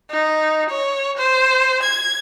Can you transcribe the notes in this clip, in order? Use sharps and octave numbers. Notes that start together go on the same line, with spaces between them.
D#4
C#5
C5
G#6